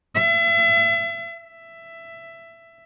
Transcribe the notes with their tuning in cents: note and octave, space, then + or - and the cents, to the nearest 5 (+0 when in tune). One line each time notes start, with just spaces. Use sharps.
E5 +35
E5 +15